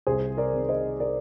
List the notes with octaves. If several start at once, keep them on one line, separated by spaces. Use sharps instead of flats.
C2 G#4 C5
A#4 D5
C3 D#3
C5 D#5
A#4 D5